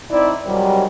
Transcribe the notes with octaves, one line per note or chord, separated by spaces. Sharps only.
C4 D#4 E4 D5
G#2 C3 D#3 F#3 G3